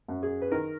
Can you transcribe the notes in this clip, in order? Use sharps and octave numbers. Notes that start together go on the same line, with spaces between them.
F#2
G#4
B4
D#3 A#4